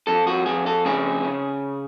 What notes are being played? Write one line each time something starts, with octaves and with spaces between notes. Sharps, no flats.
F2 A4
F#4
F2 G#4
A4
C#3 G#4
C#3